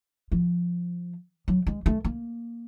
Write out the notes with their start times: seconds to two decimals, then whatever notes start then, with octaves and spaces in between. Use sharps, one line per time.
0.32 F3
1.48 F#3
1.67 G#3
1.86 A3
2.04 A#3